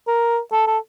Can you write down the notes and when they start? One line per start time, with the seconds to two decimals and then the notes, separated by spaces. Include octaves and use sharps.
0.08 A#4
0.52 A4
0.67 A4